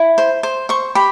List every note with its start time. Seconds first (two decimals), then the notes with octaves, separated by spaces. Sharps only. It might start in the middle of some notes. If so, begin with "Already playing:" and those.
Already playing: E4
0.18 C5
0.43 C5
0.69 C5 C#6
0.95 G4 B5